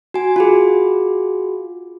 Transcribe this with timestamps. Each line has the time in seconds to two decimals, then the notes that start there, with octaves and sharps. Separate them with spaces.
0.14 F#4 G#5
0.36 F4 F#4 G#4